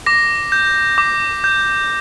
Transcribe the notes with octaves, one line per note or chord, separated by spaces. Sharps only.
D6 A#6
G6
D6
G6